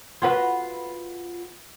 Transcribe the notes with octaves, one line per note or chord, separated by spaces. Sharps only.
F4 F#4 B4